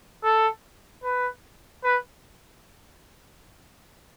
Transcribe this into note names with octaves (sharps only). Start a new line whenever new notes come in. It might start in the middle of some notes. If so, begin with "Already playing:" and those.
A4
B4
B4